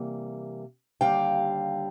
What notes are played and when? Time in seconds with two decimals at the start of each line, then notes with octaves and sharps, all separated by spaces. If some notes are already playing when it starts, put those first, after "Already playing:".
Already playing: C3 E3 G3 A#3
1.01 D#2 D3 G3 F5 G5